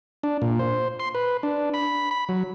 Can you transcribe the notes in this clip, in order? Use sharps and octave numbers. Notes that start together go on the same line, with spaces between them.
D4
A#2
C5
C6
B4
D4
B5
B5
F#3